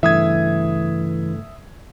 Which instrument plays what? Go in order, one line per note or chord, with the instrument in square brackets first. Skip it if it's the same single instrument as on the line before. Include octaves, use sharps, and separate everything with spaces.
[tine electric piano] G2 C#3 A3 [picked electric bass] E3 [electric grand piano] E5 D#6 G#6